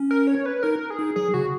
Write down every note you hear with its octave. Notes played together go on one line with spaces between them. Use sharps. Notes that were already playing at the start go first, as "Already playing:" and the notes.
Already playing: C#4
A#4
C#5
B4
D#4 A#4
G#4
D#4
F#3 G#4
C#3 F#4